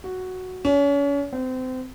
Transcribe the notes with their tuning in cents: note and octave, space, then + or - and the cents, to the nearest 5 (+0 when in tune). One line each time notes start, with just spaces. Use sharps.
F#4 +0
C#4 +35
C4 -30